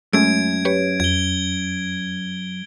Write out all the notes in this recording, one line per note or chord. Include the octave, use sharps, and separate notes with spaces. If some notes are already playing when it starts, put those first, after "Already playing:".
F#2 G#3 A3 C#4 G#6 D7
G4 B4 C#5
F2 G#6 G7